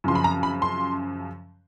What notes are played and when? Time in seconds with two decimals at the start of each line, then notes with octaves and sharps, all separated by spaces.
0.04 F#2 C#3 F3 C6
0.15 B5
0.24 A#5
0.43 B5
0.62 C6